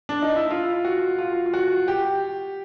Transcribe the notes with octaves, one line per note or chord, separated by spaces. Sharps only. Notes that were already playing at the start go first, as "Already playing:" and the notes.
D4
D#4
E4
F4
F#4
F4
F4
F#4
G4